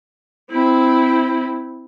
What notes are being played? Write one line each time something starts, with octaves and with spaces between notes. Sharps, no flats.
C4 E4